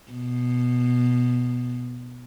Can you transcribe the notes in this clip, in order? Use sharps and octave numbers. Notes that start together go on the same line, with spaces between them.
B2